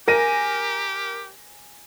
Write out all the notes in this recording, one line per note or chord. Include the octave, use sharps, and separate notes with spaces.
G4 A#4 G#5 A#6 D#7